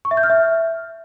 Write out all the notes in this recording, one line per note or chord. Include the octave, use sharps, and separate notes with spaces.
C#6
E5
G6
F6
E5